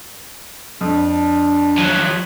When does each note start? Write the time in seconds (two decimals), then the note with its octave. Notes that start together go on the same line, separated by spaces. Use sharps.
0.81 F2 D4
1.78 F3 F#3